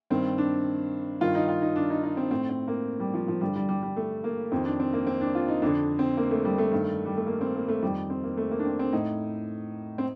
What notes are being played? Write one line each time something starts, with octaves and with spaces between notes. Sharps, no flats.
G2 D#3 C4
D4
G2 D#3 F4
D#4
F4
D#4
D4
D#4
D#4
C4
A2 C4
C4
A#3
G3
F3
F3
G2 D3 G3
G3
G3
G3
A3
A#3
F2 D#3 C4
D4
C4
A#3
C4
D4
F4
D#4
F2 D3 D4
C4
A#3
A3
G3
A3
G2 D#3
G3
A3
A#3
C4
A#3
A3
F2 D#3 G3
C4
A#3
A3
A#3
D4
C4
C4
A2 D#4
C4